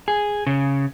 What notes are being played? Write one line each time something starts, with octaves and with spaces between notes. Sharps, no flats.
G#4
C#3